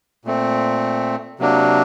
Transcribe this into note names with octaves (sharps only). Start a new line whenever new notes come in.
A#2 A3 C4
C3 F#3 A#3 D4